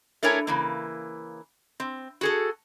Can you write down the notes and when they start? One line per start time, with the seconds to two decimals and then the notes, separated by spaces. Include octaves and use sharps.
0.23 A3 D4 E4 A#4 C#5 G#5
0.47 C#3 E3 A#3
1.80 C4
2.21 F#4 G#4 A4